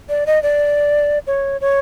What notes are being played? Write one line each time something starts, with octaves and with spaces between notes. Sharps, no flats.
D5
D#5
D5
C#5
C#5